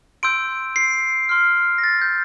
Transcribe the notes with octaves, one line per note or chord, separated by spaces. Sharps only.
C6 E6 G6 D7
C7
C6 F6
A#6
A6
G6